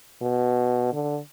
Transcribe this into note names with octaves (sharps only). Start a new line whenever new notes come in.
B2
D3